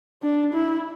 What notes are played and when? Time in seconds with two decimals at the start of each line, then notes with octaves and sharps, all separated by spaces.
0.23 D4
0.54 E4